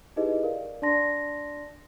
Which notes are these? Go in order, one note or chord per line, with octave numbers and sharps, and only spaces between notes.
D#4 E4 G4 G#4 B4 D#5
A#4 D5 F5
D4 D5 A5 C6 A#6